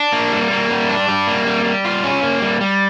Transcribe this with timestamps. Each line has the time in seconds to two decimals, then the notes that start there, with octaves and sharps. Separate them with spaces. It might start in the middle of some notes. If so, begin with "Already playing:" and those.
Already playing: D4
0.12 A#3
0.32 G3
0.51 A#3
0.70 G3
0.89 D4
1.08 G3
1.27 A#3
1.47 G3
1.65 G3
1.85 F4
2.04 C#4
2.23 A#3
2.42 G3
2.61 G3